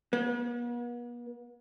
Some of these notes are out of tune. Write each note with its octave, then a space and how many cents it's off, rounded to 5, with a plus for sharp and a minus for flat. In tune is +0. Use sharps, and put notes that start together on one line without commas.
B3 -45